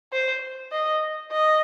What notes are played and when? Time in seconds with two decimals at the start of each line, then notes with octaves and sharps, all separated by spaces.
0.13 C5
0.72 D#5
1.32 D#5